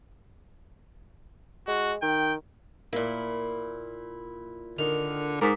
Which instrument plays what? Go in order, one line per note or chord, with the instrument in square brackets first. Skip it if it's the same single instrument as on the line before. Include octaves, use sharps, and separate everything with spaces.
[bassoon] G#3 [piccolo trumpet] F#4
[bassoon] D#3 [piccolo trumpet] G5
[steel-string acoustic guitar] A#2 E4 [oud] A#3
[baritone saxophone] D3 [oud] D#3 [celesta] A#4 F7
[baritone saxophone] G#2 [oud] A#4 [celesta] D6 D#6 B6